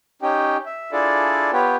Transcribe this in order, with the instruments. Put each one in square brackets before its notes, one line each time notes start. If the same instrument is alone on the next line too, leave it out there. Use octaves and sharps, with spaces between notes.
[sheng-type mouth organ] C#4 D#4 G4 G5
E5
D4 E4 F4 G#4 A4 D5
B3 F4 G4 B4 C#5 G5